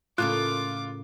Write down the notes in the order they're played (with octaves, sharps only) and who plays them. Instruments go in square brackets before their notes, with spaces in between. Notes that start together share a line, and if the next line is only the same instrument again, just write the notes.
[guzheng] A2 C#3 A#3 [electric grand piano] F4 [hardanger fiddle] D6 [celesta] F#6